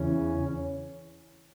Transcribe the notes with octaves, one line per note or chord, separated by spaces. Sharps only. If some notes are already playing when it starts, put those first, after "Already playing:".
Already playing: E2 C#3 E3 C#4